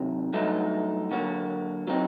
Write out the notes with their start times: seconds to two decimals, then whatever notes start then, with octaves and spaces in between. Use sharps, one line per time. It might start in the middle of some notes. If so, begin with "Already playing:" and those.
Already playing: C3 D#3 F#3
0.33 G2 F#3 A3 D#4
1.11 D3 F#3 A#3 F#4
1.87 F#3 C4 D#4